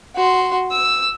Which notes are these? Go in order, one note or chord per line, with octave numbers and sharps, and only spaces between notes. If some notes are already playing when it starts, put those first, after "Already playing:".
F#4 C6
E6